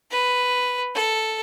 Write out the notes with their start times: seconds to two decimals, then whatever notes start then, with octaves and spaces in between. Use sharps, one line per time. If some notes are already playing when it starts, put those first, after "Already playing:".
0.11 B4
0.95 A4